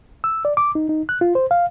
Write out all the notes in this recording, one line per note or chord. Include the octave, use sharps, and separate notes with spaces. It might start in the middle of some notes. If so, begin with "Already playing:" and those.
E6
D5
D6
D#4
D#4
F#6
F4
C5
F5